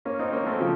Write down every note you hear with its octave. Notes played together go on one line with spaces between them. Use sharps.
A#3 C#4
C4 D#4
A#3 C#4
A3 C4
C#3 F3